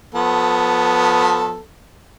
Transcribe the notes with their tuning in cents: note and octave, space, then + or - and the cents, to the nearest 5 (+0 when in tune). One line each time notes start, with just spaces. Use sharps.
F3 +35 B3 +0 A4 +0